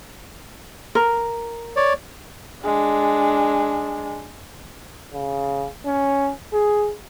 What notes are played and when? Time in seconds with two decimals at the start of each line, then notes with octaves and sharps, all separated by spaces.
0.95 A#4
1.76 C#5 D5
2.65 G#3 D4
5.14 C#3
5.86 C#4
6.53 G#4